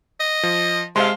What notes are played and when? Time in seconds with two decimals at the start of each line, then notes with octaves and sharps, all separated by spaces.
0.20 D#5
0.43 F3
0.96 C3 G#3 C5 F5 A5 C6